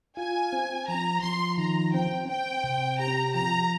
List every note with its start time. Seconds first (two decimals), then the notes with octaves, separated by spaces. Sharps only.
0.17 F4 G#5
0.53 C4
0.88 F3 A#5
1.23 F3 C6
1.58 D#3 A#5
1.94 C4 G5
2.29 C4 G5
2.64 C3
2.99 G4 A#5
3.35 F3 A#5